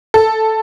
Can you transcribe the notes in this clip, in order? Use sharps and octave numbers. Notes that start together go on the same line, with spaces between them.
A4